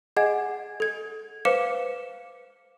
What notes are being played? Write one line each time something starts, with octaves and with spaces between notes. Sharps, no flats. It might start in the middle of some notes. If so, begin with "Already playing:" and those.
G#4 D#5 F#5 G#5 G#6
A4 G#6
B4 C5 F5 D6 C#7 E7